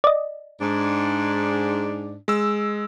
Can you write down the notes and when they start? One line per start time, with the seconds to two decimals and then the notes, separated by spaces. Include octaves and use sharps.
0.04 D5 D#5
0.61 G#2 D4
2.28 G#3 E6